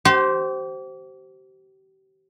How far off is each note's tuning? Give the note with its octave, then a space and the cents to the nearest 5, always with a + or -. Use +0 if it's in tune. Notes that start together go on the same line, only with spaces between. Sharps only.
G4 -35 C5 +0